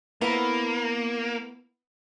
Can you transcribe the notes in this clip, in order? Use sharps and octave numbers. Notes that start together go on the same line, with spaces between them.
A#3 B3 E4